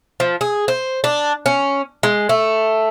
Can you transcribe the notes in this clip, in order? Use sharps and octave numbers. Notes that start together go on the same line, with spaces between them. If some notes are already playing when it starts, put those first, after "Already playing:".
F3
G#4
C5
D4
C#4
G#3
A3